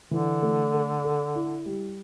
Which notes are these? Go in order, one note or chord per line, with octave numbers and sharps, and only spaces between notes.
D3 E3
A3
A4
A4
E4
G3